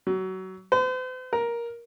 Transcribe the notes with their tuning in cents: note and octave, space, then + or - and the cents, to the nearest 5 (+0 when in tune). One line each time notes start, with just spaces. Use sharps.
F#3 +25
C5 -45
A#4 +10